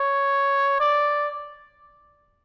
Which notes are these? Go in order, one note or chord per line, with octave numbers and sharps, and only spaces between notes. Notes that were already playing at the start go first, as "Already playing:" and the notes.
Already playing: C#5
D5